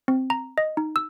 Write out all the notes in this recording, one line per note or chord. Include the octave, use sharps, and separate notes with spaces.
C4
A#5
D#5
D#4
E6